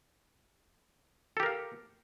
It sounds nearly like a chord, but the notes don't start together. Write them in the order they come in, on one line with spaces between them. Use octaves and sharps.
A4 G4 A#4 F5